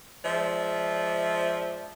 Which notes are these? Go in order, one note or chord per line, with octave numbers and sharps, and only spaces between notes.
F3 G#3 D5 E5